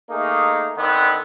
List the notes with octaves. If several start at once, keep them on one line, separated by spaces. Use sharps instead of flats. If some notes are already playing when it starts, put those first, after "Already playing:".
A3 A#3 D#4 G#4
D3 D#3 B3 C4